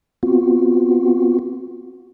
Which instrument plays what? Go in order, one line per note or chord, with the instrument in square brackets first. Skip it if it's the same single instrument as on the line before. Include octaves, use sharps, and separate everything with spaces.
[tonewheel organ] B3 C4 F4 F#4